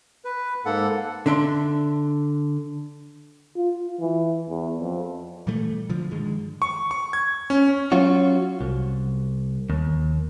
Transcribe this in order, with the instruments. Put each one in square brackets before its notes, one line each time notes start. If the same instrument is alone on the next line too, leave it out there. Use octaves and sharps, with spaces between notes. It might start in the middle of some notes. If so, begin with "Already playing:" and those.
[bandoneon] B4
G#2 A#3 A4 F#5
[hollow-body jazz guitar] D3 D4 E5 C6
[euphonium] F4
E3
E2
F2
[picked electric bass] A#2 E3 G3 A3
B2 D3 F3
G2 D3 D#3 G#3
[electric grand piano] C#6
C#6
G#6
C#4
[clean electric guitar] F#3 C#4 F4 F#4
C2
D#2